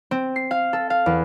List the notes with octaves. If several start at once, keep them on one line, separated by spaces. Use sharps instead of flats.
C4
C7
F5
A4
F5
E2